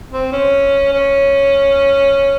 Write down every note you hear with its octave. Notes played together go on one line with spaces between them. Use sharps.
C4
C#4
C#4